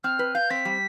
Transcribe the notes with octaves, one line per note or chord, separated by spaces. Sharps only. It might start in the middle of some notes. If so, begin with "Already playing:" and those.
C4 F6
B4
F5 G6
C4 B6
G3